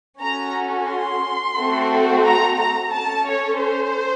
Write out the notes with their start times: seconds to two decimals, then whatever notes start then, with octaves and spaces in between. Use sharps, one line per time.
0.21 C#4 F#4 A4 A#5
0.89 C6
1.57 A3 C4 F#4 A4
2.25 A#5
2.58 A#5
2.92 C#4 A4 A5
3.27 C#5
3.59 C5